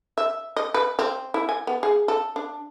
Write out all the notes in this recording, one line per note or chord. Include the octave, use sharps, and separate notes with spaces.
E5
D#5
B4
C4
E4
G#5
B3
G#4
A4
D4